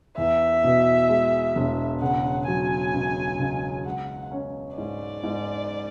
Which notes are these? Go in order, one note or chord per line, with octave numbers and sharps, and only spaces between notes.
E2 E5
B2
G#3
E1
C#3 F#5
F#3 G#5
C#2
C#2
G#3 F#5
C#4
G#2 D5
G#2